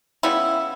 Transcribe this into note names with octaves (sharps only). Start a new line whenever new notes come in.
C#3 G3 B3 E4